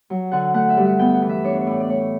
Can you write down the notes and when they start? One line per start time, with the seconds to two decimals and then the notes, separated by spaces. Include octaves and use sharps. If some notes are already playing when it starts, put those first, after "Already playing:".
0.10 F#3
0.32 D3 F#5
0.54 A3 F#5
0.69 E5
0.77 G2
0.85 F#5
0.99 B3 G5
1.14 F#5
1.22 E3
1.29 E5
1.44 D4 C#5
1.61 C#5
1.67 A2 D5
1.80 D5
1.89 A3 C#5